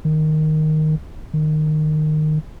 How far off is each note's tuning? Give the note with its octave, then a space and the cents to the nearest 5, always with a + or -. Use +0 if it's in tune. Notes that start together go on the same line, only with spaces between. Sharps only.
D#3 -5
D#3 -20